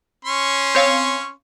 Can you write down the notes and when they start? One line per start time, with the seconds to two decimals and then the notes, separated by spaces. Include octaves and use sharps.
0.25 C#4 C6 C#6
0.75 C4 C#5 F5